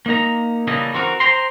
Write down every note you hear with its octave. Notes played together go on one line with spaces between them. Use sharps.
A#3 D#4 A#5
C#3 E3 G3 A#3 A4 D#5
E3 C4 F#4 A#4
C5 G5 A#5 C6